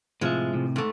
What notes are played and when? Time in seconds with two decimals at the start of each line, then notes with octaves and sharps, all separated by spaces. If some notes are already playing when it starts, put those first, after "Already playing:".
0.21 A2 C3 F3 G#3 E5
0.54 A2 C3
0.76 G#2 A3